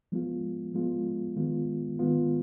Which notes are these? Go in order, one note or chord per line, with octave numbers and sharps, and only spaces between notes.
F3 G#3 B3 F4
F3 G#3 B3 F4
D#3 G#3 B3 F4
D#3 G#3 B3 F4